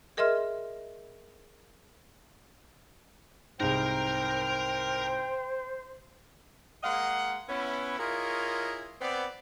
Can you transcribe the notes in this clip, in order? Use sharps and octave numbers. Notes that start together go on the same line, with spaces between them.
G#4 A#4 D#5 E5 C6 F6
C2 G#2 A#4 C5 G5 A#5
G#3 A#3 D#5 F5 F#5
B3 C#4 E4
E4 F4 G#4 A#4 C#5 D#5
B3 C4 D5